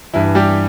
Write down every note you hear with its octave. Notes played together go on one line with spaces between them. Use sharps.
G2 E3 E4
G3 G4